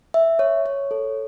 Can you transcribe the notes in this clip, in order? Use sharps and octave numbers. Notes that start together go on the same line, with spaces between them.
E5
C#5
C#5
A4